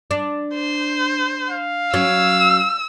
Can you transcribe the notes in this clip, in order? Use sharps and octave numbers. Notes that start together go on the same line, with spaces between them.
D4
C5
F5
F#3 C#4 E6